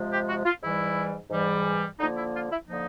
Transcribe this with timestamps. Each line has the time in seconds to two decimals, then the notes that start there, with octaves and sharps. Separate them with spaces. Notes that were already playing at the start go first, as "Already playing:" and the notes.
Already playing: C3 F3 G#3
0.11 G4
0.28 F#4
0.45 F4
0.62 G#2 E3 G3 E4
1.30 G#2 E3 G3
1.99 D3 F3 A#3 D#4
2.16 E4
2.34 F4
2.51 E4
2.68 D3 F3 A#3 D#4